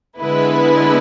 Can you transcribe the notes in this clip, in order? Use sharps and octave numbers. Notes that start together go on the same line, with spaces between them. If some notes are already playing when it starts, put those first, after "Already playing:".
D3 G#3 B3 E4 B4